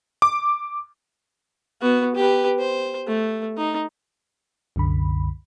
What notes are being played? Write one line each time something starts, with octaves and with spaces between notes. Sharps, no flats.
D6
B3 F#4
G4 B4
C5
A3
D#4
C2 F#2 D3 B5